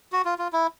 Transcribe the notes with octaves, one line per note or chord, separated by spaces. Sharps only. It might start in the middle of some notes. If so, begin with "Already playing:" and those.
F#4
F4
F4
E4